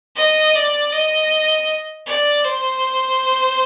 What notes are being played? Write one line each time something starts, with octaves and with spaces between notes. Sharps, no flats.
D#5
D5
D#5
D5
C5